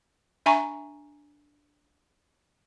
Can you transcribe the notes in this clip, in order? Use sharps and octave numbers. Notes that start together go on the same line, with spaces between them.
D4 E5 G#5 A#5 B5 C#6